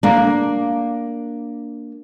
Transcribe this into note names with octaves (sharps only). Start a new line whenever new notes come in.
A#3 D4